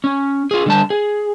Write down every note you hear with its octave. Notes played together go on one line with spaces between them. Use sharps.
C#4
F4 G#4
D3 G3 A5
G#4